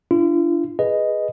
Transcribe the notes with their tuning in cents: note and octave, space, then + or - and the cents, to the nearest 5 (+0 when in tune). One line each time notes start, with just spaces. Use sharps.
D4 +0 F4 -40
G#4 +0 B4 +0 D#5 +0